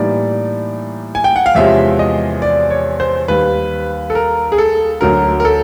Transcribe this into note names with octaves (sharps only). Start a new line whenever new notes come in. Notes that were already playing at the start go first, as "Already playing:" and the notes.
Already playing: A2 E3 G3 A#3 D#4 D5
G#5
G5
F#5
F5
E2 C3 F3 G#3 C#4 E5
D#5
D5
C#5
C5
D#2 D#3 G3 B4
A4
A#4
G#4
A4
D2 D3 F#3 A#4
A#4
A4